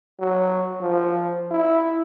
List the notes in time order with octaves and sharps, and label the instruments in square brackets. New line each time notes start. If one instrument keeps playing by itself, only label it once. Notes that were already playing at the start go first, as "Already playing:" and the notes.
[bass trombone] F#3
F3
E4